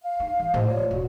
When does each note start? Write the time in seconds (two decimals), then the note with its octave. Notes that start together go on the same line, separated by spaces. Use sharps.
0.01 F5
0.20 D#4
0.40 E3
0.54 A2 F3 G4 C5 D#5
0.68 F4 C#5 D5
0.91 E1 F#4